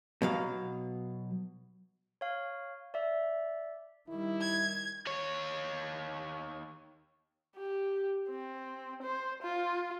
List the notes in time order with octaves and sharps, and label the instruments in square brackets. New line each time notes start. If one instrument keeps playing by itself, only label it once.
[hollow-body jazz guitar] B2 F#3 F5
[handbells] C#5 F5
D5 E5
[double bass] D#3 G3 [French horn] E4
[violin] G#6
[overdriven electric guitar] D#2 C#5
[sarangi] G4
C4
C5
F4